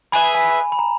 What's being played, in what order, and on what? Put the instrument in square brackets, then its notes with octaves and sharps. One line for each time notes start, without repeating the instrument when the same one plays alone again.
[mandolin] G#4 B4 E5 [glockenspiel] B5
[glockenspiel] G#5
B5
A#5